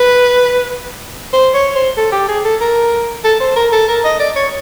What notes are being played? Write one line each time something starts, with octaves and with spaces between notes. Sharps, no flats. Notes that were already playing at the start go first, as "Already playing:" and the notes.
Already playing: B4
C5
C#5
C5
A4
G4
G#4
A4
A#4
A4
C5
A#4
A4
A#4
D#5
D5
C#5